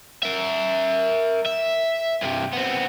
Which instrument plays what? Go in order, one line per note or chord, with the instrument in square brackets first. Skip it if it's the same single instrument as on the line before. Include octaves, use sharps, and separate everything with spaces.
[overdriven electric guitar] A#4 E5
E5
G2 C3
B3 C4